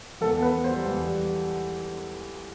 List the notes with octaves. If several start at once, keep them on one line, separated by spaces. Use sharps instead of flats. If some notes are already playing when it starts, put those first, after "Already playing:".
E2 A4
B3
B4
B3
C5
G3
E2
G3